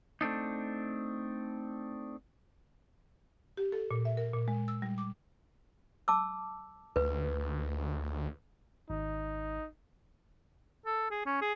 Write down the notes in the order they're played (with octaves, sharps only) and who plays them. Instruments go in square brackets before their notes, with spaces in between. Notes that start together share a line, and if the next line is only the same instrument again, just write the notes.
[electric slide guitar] A3 C4 D4 D#4
[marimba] G4
A4
A#2
E5
A#4
A#2
G#3
E6
G3
D6
[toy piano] A5 D6 E6
[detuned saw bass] D2 [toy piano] B4
[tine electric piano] G#1 [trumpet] D#4
[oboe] A4
G#4
C#4
G#4